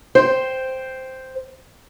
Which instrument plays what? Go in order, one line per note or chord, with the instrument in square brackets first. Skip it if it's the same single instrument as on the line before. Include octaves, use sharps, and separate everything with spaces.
[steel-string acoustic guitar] C5 G5